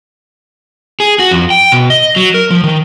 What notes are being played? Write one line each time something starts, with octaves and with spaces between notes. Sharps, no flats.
G#4
F#4
F2
G5
B2
D#5
F#3
A#4
F3
D#3